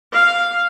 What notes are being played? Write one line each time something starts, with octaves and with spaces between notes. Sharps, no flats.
F5